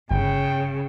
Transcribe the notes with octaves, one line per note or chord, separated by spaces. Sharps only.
G1 C#3 G5